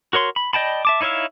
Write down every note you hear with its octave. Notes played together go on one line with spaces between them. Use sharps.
F#4 A#4 C#5 C6
B5
D5 D#5 G5 A5 B5
E5 A5 D6
D#4 E4 C#5 E5 F5